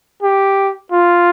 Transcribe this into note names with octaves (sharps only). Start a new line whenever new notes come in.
G4
F4